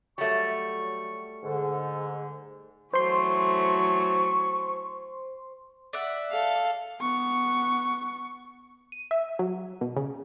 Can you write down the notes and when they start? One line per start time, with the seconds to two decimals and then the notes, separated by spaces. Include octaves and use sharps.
0.18 F#3 G3 A3 C#6
1.43 G#2 D3
2.94 E3 F#3 A3 C5 C6 C#6
5.93 D5 E5 F#5
6.31 A4 F5
7.00 B3 C#6
8.92 D#7
9.11 E5
9.39 F#3
9.81 B2
9.97 C#3